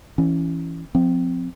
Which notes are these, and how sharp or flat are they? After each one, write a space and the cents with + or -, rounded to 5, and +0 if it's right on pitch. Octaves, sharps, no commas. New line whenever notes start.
E3 +10 C#4 +0
F3 +20 C4 -15